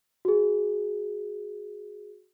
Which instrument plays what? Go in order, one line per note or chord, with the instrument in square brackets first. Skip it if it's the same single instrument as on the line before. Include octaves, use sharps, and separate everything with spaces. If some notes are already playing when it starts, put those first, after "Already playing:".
[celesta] F#4 G#4